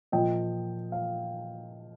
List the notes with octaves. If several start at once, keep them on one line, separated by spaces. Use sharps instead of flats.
A#2 F3 D#5 G5
F5